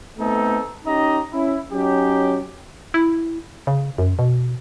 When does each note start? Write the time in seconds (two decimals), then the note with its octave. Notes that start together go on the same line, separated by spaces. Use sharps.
0.19 A3 B3 C4 D#4 A4
0.85 C#4 D#4 G4 D#5 A#5
1.33 C#4 E4
1.72 F#3 C#4 D#4 G4
2.94 E4
3.67 C#3
3.98 F#2
4.19 B2